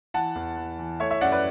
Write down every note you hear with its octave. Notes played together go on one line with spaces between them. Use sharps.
E3 F#5 A5
E2
E3
E3
A3 C#5 E5
C#5 E5
F#2 D5 F#5
B4 D5